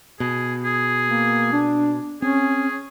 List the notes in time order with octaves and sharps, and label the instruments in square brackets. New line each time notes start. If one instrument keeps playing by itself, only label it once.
[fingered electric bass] B2 [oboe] G#4
[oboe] G#4
[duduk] A#3
D4
[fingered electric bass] C4 [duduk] C#4 [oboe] G#4